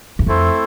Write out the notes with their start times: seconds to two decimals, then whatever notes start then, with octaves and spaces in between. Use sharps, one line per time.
0.19 E2
0.26 F2 A3 C4 E4 A4 C5